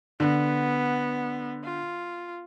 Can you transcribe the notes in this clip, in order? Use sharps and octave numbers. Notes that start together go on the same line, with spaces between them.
D3 B3
F4